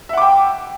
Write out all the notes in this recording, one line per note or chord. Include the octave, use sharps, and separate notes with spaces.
E5 F#5 G5 D6